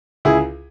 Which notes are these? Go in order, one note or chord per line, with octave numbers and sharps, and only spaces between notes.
C#2 E4 G#4